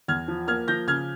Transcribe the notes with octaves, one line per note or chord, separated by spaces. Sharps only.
E2 F6 G#6
F3
A#3 F6 G#6
F3 G6 A#6
C#3 F6 G#6